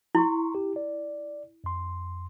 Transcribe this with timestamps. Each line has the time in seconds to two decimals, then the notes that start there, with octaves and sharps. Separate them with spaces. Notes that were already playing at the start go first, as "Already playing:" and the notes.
0.15 E4 A#5 C6 C#6
0.55 G4
0.76 D5
1.64 F2 C6